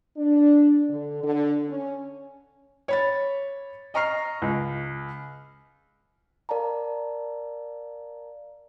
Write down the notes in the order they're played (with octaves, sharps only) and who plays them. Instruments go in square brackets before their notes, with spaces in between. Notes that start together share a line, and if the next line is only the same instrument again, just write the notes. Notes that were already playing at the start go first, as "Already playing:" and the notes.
[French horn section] D4
D3
D3
C#4
[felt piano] C#5 B5 A6
D#5 A#5 C#6 F6 C7
C#2
[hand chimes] A#4 D5 F5 A5 A#5